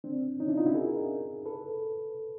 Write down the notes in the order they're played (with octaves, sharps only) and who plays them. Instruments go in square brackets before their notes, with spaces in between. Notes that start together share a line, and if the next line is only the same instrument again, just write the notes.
[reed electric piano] C4 D4
C#4 D#4
D4 E4
D#4 F4
E4 F#4
G#4 A#4
A4 B4